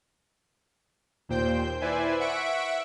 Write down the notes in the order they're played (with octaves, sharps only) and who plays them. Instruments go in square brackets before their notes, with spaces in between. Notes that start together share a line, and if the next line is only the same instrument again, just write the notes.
[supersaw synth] D#2 A#2 C5 G5 G6
E4 B4 C5 D5 E5 G#5
E5 F#5 C#6 B6 D7